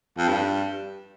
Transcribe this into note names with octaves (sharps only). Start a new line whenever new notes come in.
F2
G2